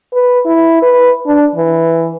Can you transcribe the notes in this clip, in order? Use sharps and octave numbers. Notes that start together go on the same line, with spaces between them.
B4
E4
B4
D4
E3